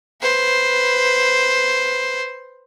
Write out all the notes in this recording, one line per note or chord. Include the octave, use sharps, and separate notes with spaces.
B4 C5